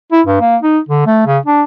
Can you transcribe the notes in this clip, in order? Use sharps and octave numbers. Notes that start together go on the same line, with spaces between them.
E4
G2
A#3
D#4
D3
A3
C#3
D4